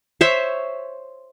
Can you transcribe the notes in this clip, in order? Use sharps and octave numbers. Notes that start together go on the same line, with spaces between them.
C5 C#5 E5